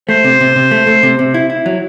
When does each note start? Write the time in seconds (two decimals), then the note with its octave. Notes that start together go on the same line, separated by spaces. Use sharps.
0.09 A3 C5
0.25 C3
0.41 C3
0.56 C3
0.71 A3
0.87 A3
1.03 C3
1.19 C3
1.34 E4
1.50 E4
1.66 F#3